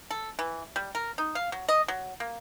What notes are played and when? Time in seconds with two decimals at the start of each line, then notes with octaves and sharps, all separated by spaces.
0.11 A4
0.39 E3
0.76 G3
0.95 A#4
1.18 D#4
1.35 F5
1.52 F#3
1.69 D#5
1.88 F#3
2.20 A#3